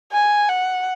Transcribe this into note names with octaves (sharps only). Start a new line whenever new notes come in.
G#5
F#5